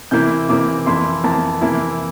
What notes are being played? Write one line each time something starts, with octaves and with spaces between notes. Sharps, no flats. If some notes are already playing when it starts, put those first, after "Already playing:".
C3 E3 A#3 E4 G6
C3 E3 A#3 E4 D6
F2 E3 A#3 E4 C6
F2 E3 A#3 E4 A5
C3 E3 A#3 E4